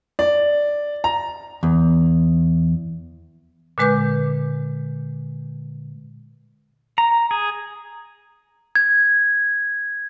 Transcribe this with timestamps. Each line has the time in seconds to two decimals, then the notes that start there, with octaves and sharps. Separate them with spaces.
0.19 D5
1.04 A#5
1.63 E2
3.78 A#2 D3 G#3 B4 D6 G6
6.98 A#5
7.31 G#4
8.75 G#6